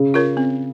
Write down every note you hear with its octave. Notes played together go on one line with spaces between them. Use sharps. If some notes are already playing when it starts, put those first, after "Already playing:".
Already playing: C#3
F4 A#4 C#5
C4